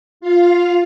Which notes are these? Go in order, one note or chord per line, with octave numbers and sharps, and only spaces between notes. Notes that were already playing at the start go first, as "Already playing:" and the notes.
F4 F5